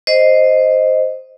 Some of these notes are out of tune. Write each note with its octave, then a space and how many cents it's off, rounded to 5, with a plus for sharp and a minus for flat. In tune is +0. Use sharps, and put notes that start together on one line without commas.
C5 +0 D#5 +0